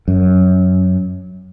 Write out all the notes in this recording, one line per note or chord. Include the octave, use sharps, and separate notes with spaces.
F#2